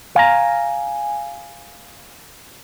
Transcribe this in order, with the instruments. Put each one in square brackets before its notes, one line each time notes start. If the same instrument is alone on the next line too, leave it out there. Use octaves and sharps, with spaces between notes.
[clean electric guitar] F5 G#5 A#5